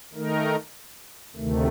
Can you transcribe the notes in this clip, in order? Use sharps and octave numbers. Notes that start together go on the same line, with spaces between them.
D#3 A3 D#4 A#4
D2 C3 D#3 A3